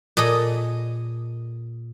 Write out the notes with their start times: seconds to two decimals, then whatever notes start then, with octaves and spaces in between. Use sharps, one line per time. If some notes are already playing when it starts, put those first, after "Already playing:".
0.17 A#2 G#4 A4 D#5